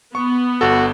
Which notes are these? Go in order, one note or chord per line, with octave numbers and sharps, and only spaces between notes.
B3 C#6
G1 F#4 A4